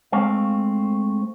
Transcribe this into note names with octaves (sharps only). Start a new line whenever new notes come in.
G#3 A3 C4 F5